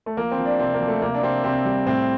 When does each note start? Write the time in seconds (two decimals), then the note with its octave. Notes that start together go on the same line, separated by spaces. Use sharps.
0.06 A3
0.17 F3 A#3
0.31 C4
0.38 F3
0.45 D4
0.59 C3 C4
0.74 A#3
0.81 F3
0.88 A3
1.02 C3 A#3
1.14 D4
1.23 C3 C4
1.44 C3 C4
1.65 G3
1.86 A2 C4